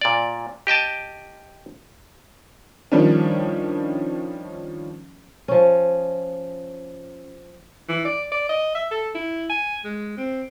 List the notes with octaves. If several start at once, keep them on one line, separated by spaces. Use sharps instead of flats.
A#2 D5
G4 D#5 G5 A5
D#3 F3 G3 C#4 D4
F3 C#4
E3
D5
D5
D#5
E5
A4
E4
G#5
G#3
C4